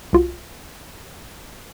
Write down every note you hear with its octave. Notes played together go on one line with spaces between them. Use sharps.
C2 F4 F#4